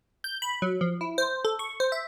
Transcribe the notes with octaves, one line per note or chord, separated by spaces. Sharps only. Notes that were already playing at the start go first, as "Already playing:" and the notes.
G6
B5
F#3
F3
E4
C5
A4
C#6
C5
E5